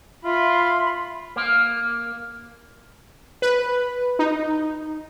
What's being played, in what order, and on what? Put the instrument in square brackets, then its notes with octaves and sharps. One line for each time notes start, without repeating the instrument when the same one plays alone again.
[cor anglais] F4 [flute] E5 [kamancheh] B5 C6
[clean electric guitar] A#3
[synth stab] B4
D#4